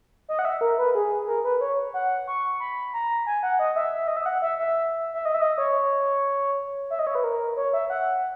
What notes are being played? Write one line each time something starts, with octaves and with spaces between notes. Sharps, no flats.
D#5
F#5
E5
A#4
B4
G#4
A#4
B4
C#5
F#5
C#6
B5
A#5
G#5
F#5
D#5
E5
D#5
E5
F#5
E5
E5
E5
D#5
E5
D#5
C#5
E5
D#5
C#5
B4
A#4
C#5
E5
F#5